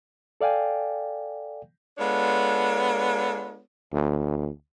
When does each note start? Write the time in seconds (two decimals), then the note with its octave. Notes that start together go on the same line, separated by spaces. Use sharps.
0.41 A4 D5 F5 G5 G#5
1.98 G#3 B3 D4 F4 A4 C#5
3.92 D2